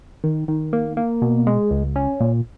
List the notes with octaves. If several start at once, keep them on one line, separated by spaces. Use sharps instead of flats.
D#3
D#3
A#3
A#3
B2
G#3
C#2
C#4
A#2